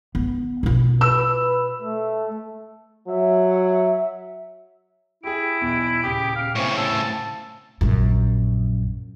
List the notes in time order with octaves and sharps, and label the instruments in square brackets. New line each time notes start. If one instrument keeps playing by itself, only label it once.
[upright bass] B3
B2 F4
[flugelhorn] B4 [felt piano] E6
[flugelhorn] A3
[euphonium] F#3 [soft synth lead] E5
[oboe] E4 [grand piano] G4 G#4 [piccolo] D7
[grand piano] B1 E2
[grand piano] D#1 C#3 D#6 [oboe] G4
[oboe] F5
[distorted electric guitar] A2 C#3 [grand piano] C4 C5 G#5 [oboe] C#6
[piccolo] A5 [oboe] E6
[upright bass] A#1 F#2